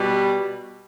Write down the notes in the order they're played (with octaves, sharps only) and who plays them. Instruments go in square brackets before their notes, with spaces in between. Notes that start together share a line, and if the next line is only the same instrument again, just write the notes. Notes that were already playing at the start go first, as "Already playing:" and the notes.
Already playing: [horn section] B2 G3